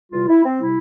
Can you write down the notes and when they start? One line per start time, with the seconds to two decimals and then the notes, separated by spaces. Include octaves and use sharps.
0.11 E2 C3 G3 F4
0.28 E4
0.43 C4
0.60 C3 G3 E4